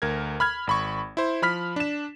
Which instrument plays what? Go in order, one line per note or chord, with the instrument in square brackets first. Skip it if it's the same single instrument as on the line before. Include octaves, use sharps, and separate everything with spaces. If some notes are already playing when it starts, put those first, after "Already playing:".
[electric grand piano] D2 A#4 G#6
B5 F6 G#6
G#1 B5 C#6
E4 C5
F3 B5 F6 B6
D4 E7